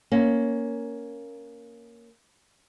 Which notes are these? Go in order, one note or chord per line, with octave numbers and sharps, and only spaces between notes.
A#3 C#4